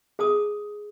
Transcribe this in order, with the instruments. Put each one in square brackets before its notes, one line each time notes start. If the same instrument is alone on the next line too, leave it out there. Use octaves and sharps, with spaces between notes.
[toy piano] G#4 A5 D#6